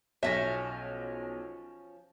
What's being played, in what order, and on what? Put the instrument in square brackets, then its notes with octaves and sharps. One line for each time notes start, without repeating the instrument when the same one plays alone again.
[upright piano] B1 A#6 [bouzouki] F3 C#4 [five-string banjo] E5